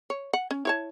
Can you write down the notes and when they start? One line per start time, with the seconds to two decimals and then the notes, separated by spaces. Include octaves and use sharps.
0.10 C#5
0.33 F#5
0.51 C#4
0.65 E4 C#5 A5